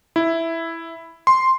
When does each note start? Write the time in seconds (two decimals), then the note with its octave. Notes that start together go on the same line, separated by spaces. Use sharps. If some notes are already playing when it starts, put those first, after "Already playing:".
0.16 E4
1.27 C6